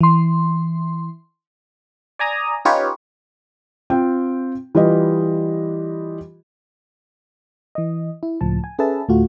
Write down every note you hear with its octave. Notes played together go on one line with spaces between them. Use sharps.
E3 C6
D5 G#5 A#5 D#6
C#4 D#4 F4 G4 B4 C#5
C4 F4 G5
E3 G3 F4 G4 B4 D#5
E3 D#5
E4
C#2 A2 F3 A5
G#5
C#4 G#4 A4 B4 E5 A5
D2 A2 A3 F4 F#4